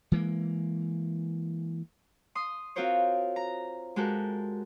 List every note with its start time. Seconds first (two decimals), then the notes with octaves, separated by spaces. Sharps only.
0.12 E3 G#3 A#3
2.35 C6 D#6
2.76 C4 F4 F#4 A#4 C5 C#5
3.36 A#5
3.96 G#3 F#4 G4 A4 A#4